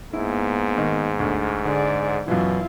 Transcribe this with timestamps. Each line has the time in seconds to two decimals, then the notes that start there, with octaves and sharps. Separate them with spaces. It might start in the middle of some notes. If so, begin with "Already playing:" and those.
0.13 G#2 A#3 B3 E4
0.77 D#3
1.20 D2
1.65 D3 G#4 D5
2.28 F#2 B2 E3 E4 F4